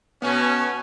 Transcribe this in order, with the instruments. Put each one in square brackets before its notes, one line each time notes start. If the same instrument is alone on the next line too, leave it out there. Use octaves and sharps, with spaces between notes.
[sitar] B2 A3 [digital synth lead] B3 [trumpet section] C#4